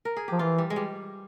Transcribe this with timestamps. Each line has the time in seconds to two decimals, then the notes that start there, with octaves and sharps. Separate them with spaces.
0.05 A#4
0.17 G#4
0.28 F3 G4
0.39 E3 F4
0.58 G3
0.70 G#3
0.76 G3